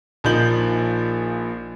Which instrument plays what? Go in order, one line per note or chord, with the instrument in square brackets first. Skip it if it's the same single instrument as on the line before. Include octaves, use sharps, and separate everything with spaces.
[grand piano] A#1 F3 A#3 D#4 G6 F#7